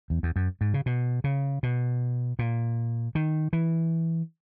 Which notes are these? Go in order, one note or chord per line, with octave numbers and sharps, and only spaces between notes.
E2
E2
F#2
G#2
C#3
B2
C#3
B2
A#2
D#3
E3